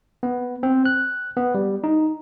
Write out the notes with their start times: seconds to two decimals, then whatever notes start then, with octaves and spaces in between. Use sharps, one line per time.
0.23 B3
0.63 C4
0.86 F#6
1.37 B3
1.55 G3
1.84 D#4